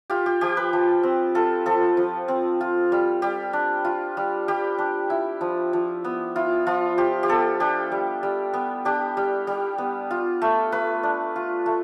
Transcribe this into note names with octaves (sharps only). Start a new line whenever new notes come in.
F4 G4
G4
F3 G4
B4
F3
C4
F4 A4
F3 A4
F3
C4
F4
G3
G3 G4
D4
F4
G3
G3 G4
D4
E4
F3
F3
B3
E4 F4
F3 F4
F3 G4
G4
B3 A4
D4 G4
G3
G3
B3
D4 G4
G3
G3
B3
F4
A3
A3 B4
D4
F4
A3